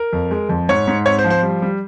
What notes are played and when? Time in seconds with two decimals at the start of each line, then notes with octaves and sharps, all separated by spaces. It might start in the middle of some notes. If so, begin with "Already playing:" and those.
Already playing: A#4
0.13 F2
0.31 G#3
0.49 F2
0.69 G#2 C#5
0.88 G#2
1.06 C4 C#5
1.19 C5
1.24 F3
1.30 C5
1.43 G3
1.62 G3